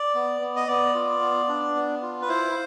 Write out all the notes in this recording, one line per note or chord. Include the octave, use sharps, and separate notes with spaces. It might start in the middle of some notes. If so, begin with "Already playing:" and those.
Already playing: D5
B3
B3
D#5
B3 D5
F4
B3
D4
B3
F4
B4
E4 C5